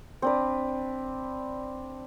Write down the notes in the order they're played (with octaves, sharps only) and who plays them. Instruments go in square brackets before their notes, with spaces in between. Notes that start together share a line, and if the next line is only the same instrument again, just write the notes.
[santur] C4 D4 B4